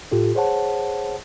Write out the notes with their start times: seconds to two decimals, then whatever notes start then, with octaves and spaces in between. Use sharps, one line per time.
0.11 A2 F4 G4 A4
0.35 G#4 C5 C#5 F#5 A5